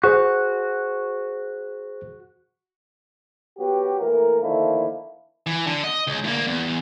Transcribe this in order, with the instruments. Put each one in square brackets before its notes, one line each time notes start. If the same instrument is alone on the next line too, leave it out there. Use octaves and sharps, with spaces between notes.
[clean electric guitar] F#4 [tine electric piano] G#4 C5
[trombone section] F#3 B3 F#4 G4
E3 A3 A#3 A#4
D3 D#3 F3 A3 A#3 E4
[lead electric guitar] E3
D3
D#5
C#2
D2 A#3
E2